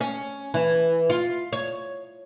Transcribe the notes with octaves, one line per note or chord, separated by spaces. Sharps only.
C#4
E3
F4
C#5